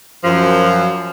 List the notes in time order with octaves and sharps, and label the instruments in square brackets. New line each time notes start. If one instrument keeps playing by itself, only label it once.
[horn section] F#2 F3